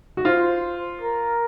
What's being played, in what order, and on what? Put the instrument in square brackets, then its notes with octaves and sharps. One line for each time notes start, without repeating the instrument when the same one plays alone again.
[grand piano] F#4
[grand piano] F4 [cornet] C5
[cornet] A#4